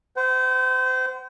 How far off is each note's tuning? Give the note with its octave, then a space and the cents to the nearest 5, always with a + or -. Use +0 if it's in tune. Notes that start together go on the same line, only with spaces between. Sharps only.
C5 -30 F#5 +40